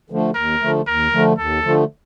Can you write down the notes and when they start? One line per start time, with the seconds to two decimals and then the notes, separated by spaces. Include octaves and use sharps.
0.10 D3 F3 A3
0.35 D#2 A#4
0.61 D3 F3 A3
0.87 D#2 A#4
1.12 D3 F3 A3
1.38 D#2 A4
1.64 D3 F3 A3